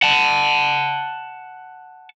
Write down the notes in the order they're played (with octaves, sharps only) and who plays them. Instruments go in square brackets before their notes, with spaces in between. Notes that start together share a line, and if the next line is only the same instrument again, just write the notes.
[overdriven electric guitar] F#5 A5